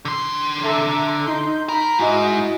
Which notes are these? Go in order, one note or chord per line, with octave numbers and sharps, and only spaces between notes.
D3 C6
A4 E5 A#5
D#4 C6 G6
A#4 B5
G#2 E4 F#4 D#5